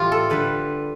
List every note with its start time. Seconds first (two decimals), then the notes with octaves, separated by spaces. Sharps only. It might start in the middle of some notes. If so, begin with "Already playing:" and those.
Already playing: A2 E3 G3 F4 G4
0.12 A4
0.30 D3 G3 B4